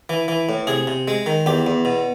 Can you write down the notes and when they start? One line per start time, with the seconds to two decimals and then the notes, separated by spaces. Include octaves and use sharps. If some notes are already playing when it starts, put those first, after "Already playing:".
0.09 E3
0.28 E3
0.49 A2
0.67 C3 G#4
0.87 C3
1.08 G#3
1.26 D#3
1.46 E2 G4
1.67 E2
1.85 B2